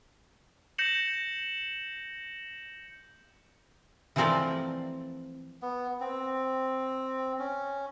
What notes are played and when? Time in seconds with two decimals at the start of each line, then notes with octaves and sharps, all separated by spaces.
0.78 G6 A#6 C#7 E7 F#7
4.16 E3 F3 A3 C4 A#4 D5
5.62 B3
6.01 C4
7.39 C#4